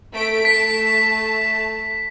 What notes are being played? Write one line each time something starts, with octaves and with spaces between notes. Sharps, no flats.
A3 B6 D7
A3 A5 B6